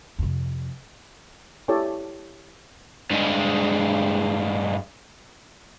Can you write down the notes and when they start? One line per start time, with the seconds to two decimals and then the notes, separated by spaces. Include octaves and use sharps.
0.19 F2 C3
1.68 E4 G4 A4 C#5 D5 G#5
3.11 G2 G#3